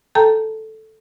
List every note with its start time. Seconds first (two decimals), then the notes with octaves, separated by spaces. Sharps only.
0.15 A4 G5 A5 A#5 G6